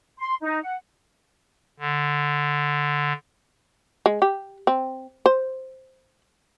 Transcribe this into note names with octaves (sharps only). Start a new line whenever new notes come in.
C6
D#4
F#5
D3
G#3
G4
C4
C5